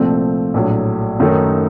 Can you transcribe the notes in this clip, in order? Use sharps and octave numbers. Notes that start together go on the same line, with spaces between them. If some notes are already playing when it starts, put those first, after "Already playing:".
Already playing: C2 A#2 F3 A3 C4
A#1 A2 F#3
F#2 D#3 F#3 A3 D#4